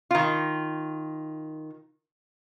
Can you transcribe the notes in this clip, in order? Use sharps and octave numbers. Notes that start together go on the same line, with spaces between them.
D#3 F4